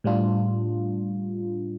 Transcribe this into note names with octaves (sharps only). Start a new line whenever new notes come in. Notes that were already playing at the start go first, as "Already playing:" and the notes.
A2 G3 D4 F4